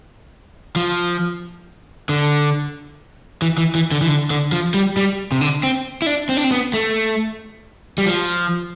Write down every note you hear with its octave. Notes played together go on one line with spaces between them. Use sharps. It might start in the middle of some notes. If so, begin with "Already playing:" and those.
F3
D3
E3
E3
E3
D3
E3
D3
D3
F3
G3
G3
C3
D3
C4
E4
D4
C4
D4
C4
B3
A3
G3
F3